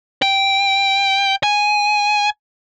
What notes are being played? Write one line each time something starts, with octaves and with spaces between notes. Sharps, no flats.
G5
G#5